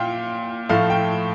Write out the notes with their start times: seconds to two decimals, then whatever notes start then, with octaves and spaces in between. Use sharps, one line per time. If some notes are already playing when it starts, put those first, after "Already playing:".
Already playing: A#2 F5 G5
0.69 A2 F3 A3 F5
0.90 G5